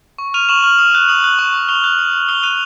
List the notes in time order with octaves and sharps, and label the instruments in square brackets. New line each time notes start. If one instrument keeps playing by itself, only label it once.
[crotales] C#6
F6 D#7 F7
C#6 E7 F#7
F6
D#6
F#6
D#6 E7 F#7
F#6
C#6
F#6
C#6 F7 G7
F#6
D#6
F#6
D#6 F7 G7
F#6 D#7 F7